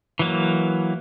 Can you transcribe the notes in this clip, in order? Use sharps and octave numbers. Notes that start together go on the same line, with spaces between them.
E3 F#3 A#3